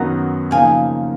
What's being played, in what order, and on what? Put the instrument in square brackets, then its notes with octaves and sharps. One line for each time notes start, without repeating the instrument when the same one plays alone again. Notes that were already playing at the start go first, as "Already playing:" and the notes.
Already playing: [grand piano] F#2 D#3 F#3 B3 D#4 [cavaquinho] F#5 A#5
[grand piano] C#3 F3 A#3 D#4 [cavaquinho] F5 G#5